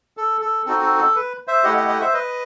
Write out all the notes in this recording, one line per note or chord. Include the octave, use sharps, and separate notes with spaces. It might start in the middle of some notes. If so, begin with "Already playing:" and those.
A4
A4
C4 D#4 F#4 A4
A4
A4
B4
C5 E5
A3 E4 G4 D#5 F#5
D#5 F#5
D#5 F#5
C5 E5
B4 D#5